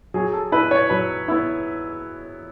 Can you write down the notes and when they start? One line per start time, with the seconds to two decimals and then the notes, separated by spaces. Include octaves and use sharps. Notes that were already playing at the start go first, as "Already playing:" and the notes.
0.14 F#3 G#4
0.33 A4
0.52 B3 E4 B4
0.71 C#5
0.90 F#3 B4
1.28 B3 E4